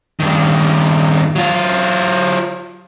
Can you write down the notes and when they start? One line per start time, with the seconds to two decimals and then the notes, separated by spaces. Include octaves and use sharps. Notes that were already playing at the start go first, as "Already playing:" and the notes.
0.20 G2 D#3
1.36 F#3 F4